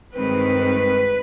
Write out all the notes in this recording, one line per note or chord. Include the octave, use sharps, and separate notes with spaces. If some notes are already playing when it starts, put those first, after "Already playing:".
G2 D#3 G#3 C4 B4